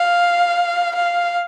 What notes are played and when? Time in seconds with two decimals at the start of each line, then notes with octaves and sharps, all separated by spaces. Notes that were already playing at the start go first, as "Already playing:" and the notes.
Already playing: F5
0.96 F5